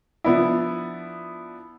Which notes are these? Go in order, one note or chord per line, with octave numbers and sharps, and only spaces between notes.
F3 B3 D4 E4